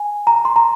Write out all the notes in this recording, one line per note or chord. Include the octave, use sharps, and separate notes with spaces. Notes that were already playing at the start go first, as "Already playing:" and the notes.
Already playing: G#5
A#5
C6
A#5